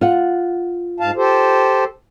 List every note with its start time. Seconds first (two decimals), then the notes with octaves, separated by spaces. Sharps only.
0.01 F4 F#5
1.00 G#2 F5 A5
1.16 G4 A4 C5